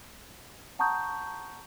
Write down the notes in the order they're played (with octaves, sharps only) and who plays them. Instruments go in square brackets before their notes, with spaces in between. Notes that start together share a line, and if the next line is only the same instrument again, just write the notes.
[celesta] F#5 A5 A#5 C#6 D#6 G6